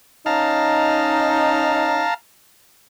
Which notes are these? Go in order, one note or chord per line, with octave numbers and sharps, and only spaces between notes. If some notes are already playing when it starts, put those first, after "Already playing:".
C#4 D#4 F5 A5 A#5